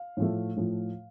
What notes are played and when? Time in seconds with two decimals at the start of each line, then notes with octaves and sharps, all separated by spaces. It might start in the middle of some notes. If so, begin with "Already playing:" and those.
Already playing: F5
0.17 A2 F3 A3
0.57 A2 F3 A3